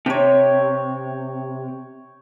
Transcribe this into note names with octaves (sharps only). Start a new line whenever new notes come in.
C3 C#5 G5